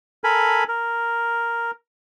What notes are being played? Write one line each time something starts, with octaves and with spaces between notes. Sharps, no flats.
A4 A#4 G#5 B5
A#4